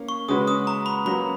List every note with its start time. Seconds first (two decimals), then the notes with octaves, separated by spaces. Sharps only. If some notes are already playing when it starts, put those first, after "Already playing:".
Already playing: A#3 C#4
0.09 C#6
0.28 C#3 G#3 C#4 F#4 B4 D#6
0.47 D#6
0.67 A#5
0.86 B5
1.05 F#3 A#3 C#4 F#4 B4 B5